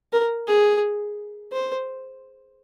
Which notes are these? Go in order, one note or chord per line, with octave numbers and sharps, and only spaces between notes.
A#4
G#4
C5